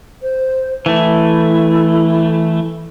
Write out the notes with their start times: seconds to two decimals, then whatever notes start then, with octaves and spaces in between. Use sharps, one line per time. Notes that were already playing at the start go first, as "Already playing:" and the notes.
0.23 C5
0.86 E3 A3 E4